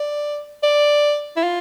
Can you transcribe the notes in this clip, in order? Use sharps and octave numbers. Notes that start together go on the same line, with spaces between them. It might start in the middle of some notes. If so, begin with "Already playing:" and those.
Already playing: D5
D5
E4
F4